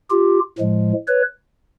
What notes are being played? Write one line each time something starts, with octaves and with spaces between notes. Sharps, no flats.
F4 G4
A2 F3 G#3
B4 C#5